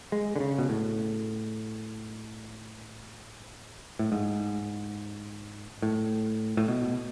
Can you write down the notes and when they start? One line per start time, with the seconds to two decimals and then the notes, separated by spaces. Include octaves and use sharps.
0.12 G#3
0.36 D3
0.40 C#3
0.58 B2
0.69 A2
3.99 A2
4.12 G#2
5.82 A2
6.57 A2
6.68 B2